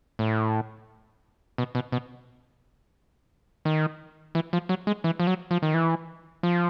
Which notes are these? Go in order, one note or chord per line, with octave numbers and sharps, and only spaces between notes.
A2
B2
B2
B2
D#3
E3
F3
F#3
G#3
E3
F3
F#3
F3
D#3
E3
F3